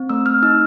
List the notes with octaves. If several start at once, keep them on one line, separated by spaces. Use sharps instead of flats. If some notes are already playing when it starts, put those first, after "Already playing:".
Already playing: C4
A3 E6
F6
D#4 E6